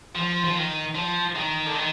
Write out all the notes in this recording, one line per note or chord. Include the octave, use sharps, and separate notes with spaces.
F3
F3
D#3
F3
D#3
D3
D#3